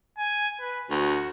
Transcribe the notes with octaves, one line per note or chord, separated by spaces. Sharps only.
G#5
B4
D2 F#4